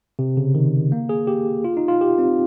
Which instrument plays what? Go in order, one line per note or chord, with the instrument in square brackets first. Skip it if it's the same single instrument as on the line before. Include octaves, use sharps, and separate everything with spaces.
[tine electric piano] C3
C#3
D#3
A#3
G#4
G4
F4
D#4
F4
G4
C4